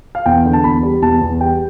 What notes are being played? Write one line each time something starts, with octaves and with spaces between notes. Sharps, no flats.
F5
E2 G5
D3
A5
E2 B5
G3
E2 A5
E2
G3 G5